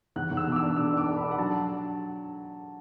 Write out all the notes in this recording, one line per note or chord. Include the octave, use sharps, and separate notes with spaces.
E2 F#6
E2
E6
B2
D6
E6
D4
B2 E6
D4 D6
D4
B5
D4
F#5
F#3 A5